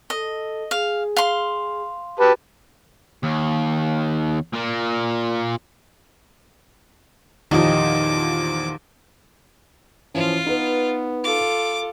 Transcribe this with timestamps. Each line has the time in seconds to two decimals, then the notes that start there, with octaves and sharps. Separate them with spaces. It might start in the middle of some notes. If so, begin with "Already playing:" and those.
0.10 A4 D#5
0.71 G#4 F5
1.16 F5 C6
2.20 F#4 G4 B4 A5
3.23 D#2
4.54 A#2 A#3
7.51 E2 A#2 D#3 F3 D#4 G4 D6
10.15 E3 F3 C#4 F4
10.46 B3 D#4 B4
11.24 F4 A4 D6